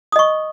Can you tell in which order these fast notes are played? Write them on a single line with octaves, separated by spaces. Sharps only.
D#6 D#5 C#6